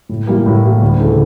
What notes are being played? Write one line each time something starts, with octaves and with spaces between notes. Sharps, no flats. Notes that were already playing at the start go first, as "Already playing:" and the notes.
A2
E3 G3 A#3
A2
E3 G3 A#3
D2
C#3 E3 A3